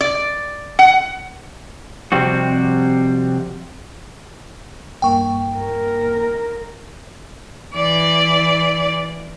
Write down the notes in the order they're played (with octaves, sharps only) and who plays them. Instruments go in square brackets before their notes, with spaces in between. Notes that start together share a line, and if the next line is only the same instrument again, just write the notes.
[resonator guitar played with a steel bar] D5
F#5
[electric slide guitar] F2 C3 G3 C4 F#4
[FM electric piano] A#1 G2 A#3 [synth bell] G5 C#6
[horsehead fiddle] A#4
[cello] E3 D5